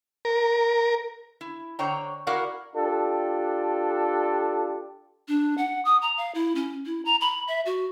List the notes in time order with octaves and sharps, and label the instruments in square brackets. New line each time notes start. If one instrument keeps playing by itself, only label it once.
[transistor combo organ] A#4
[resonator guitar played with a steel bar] E4
D3 C5 C#5 G5 A#5
E4 F#4 A#4 D5 F5 F#5
[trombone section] D4 F4 G4 A4
[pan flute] D4
F#5
D#6
A#5
F5
E4
C#4
E4
A#5
B5
E5
F#4